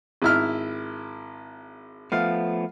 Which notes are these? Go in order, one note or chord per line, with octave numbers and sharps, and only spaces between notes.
G#1 E4 F6
F3 A3 B3 F5